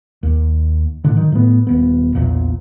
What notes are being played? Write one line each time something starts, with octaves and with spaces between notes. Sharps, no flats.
D#2
A2 D3
D#3 F#3
A2 B3
D#1 B3
A#1 E2 A#2